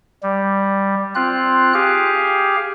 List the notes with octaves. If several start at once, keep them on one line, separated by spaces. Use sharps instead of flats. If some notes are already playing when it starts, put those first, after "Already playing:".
G3
C4 F4 F#6
G4 G#4 F5